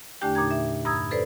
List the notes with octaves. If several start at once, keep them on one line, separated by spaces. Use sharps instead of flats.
E2 D3 A3 D4 G4 G5
A#2 D#4 A#5 G#6
E5
G2 A#5 B5 D#6 E6 G#6
A4 B4 C5 D5